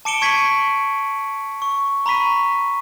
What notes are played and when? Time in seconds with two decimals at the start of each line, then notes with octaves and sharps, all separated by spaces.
0.05 A5 D6 C#7 D7 E7 G7
0.22 C#6 G#6 B6 C#7 D#7 F#7
1.62 C#6
2.06 A#5 B5 C#6 B6 D#7